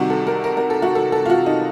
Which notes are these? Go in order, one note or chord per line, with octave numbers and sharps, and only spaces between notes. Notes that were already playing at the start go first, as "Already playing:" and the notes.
Already playing: C2 C3 D#3 F#4
A4
A#4
A#4
A#4
A4
F#4
A4
A4
F4
F#4
D#4